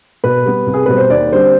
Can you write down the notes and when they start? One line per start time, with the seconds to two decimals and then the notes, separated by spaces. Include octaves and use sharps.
0.24 B2 B4
0.45 G3 B3
0.66 C2
0.74 G#4
0.86 B2 G3 C4 B4
0.98 C5
1.10 D#2 D5
1.32 D3 G3 C4 C5